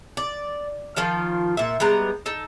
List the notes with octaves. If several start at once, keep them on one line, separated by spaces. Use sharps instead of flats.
D5
D#3 F3 F4 F5
A#2 E5
G3 G#3 B3 A#5
D#4 A4